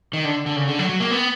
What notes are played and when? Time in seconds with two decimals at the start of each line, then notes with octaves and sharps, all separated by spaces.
0.13 D#3
0.25 D3
0.46 D3
0.56 C#3
0.68 D3
0.79 F#3
0.89 F#3
1.00 A#3
1.11 B3